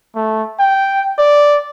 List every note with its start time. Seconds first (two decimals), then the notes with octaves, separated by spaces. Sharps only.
0.15 A3
0.59 G5
1.18 D5